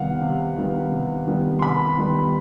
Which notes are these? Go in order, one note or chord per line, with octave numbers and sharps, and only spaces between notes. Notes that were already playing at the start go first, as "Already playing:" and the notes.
Already playing: C3 D#3 G3 B3 F5 F#5
C3
D#3 G3 B3
C3
D#3 G3 B3
C6
C3 B5
D#3 G3 B3